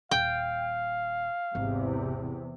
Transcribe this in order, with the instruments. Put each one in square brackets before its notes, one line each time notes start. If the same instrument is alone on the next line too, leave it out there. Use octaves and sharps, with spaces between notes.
[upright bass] D#1 [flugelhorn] F5 [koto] G5
[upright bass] G#1 [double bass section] E2 C3